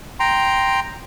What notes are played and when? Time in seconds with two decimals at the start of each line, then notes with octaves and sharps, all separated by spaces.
0.20 G5 A#5 C6